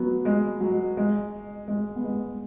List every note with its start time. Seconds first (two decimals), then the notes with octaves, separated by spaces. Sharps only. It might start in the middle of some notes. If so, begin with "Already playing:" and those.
Already playing: F#3 B3
0.25 G#3
0.61 F#3
0.97 G#3
1.68 G#3
1.96 B3
2.04 G#3